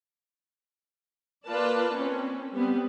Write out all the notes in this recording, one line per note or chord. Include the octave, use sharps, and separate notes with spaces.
A#3 F4 B4 D5 A5
C4 C#4
G3 B3 C4